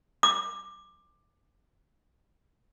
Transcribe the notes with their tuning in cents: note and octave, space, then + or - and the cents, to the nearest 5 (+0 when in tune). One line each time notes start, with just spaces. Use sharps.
D6 +15